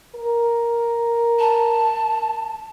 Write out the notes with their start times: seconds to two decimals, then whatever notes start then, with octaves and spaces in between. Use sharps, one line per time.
0.15 A#4
1.39 A5